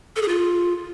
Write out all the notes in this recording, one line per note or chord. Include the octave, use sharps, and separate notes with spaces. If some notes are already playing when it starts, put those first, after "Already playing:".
A4
G#4
F4